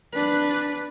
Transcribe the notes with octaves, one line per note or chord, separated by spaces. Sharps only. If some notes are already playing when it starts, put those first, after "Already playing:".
D4 B4